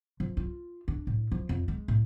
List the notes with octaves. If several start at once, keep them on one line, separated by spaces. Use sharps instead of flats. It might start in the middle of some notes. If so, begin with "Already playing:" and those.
F3
F4
D4
A2
F3
F2
G#3
A2